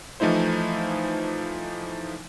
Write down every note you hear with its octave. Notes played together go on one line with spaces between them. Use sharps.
E3 F3 A3 D#4 E4 C5